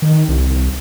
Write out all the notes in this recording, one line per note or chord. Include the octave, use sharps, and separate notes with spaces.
D#3
C2